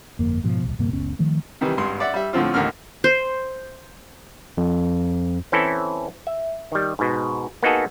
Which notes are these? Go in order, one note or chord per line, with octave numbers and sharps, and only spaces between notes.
G1 F2 A#3
G#2 B2 F3
D#1 C2
D#1 G2 C3 A#3
F#1 C#2 B3 C#4
D#3 F3 A3
C3 D#3 E3 G3
G#1 G2 C6
D5 E5 F#5
G3 E5
A2 D3 F3 C4 F4
A1 D#2 D3 A#3 F6
C5
F2
E3 C4 C#4 E4 A4
E5
D#3 G3
G#2 B2
A#3 B3 D#4 F#4 G#4 A4